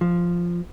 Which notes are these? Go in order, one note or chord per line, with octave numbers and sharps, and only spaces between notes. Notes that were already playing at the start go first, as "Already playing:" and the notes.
F3